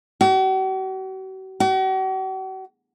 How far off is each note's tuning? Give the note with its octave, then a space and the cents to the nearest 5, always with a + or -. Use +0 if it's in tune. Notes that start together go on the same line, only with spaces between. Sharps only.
F#4 +45
F#4 +45